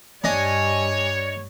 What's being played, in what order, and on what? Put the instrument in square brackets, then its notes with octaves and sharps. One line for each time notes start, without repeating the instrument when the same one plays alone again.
[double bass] G2 G3 [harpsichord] D4 D#5 [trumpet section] C#5 [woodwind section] G#5